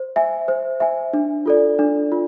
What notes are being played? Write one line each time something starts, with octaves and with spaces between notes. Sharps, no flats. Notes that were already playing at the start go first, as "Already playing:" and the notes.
Already playing: C5
E5 G#5
C5
E5 G#5
D4
F4 A4 D5
D4
F4